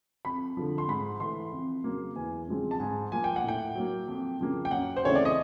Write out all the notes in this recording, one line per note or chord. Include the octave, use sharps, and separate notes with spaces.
F2 B5
D3 F3
C6
G#2 B5
E3 A3 C6
F2
C#3 F#3 A#3
E2 G#5
C#3 F3 G#3 C4
A5
G#2 G#5
F3 A#3 G#5
G5
F#5
A2 G5
F#3 A#3
F2
C#3 F3 A#3
G5
F#2 F#5
C5
C#3 E3 A3 C4 C#5
D5
D#5